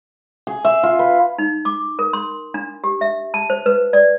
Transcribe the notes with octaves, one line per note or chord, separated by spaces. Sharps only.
G#4
E5
F4
B4
D#4
D6
A#4
C6
D4
G4
E5
A5
C5
B4
D5